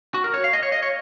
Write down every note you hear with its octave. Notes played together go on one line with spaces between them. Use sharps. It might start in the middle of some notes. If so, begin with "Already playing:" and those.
F#4
A#4
C#5
F5
D#5
C#5
D#5
C#5